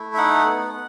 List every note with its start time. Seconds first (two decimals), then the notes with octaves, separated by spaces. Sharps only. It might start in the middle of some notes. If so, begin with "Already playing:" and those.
Already playing: A3 E4
0.14 E5
0.18 D#4 F#5
0.46 B3